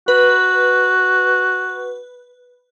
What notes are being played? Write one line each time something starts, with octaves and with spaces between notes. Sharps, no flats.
F#4 B4